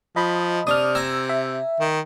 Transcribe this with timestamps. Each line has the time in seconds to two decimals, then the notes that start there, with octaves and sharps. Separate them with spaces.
0.16 F3 D#5 B5
0.67 C3 D4 D#6 F6
0.95 G#5 A#5 E6
1.29 E5
1.80 D#3